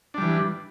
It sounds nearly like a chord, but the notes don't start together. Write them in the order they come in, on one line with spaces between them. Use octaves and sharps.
D4 G3 E3